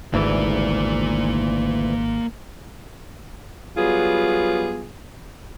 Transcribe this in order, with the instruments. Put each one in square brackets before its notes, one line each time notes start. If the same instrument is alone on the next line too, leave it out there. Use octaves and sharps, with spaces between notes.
[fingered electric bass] G#1 G#2 [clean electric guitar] D2 E3 [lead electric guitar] A#3 D5
[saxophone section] F#3 G3 B3 F4 G#4